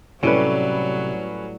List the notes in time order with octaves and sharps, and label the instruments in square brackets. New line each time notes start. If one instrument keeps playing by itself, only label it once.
[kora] A2 G3 [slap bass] C3 [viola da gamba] F#3 [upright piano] C#4 A4 B4